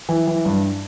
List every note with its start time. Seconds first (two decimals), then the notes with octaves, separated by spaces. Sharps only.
0.09 E3
0.27 E3
0.45 G2